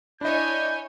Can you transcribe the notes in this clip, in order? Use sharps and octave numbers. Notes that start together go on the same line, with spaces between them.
D4 E4 C#5 D#5 G#5 G6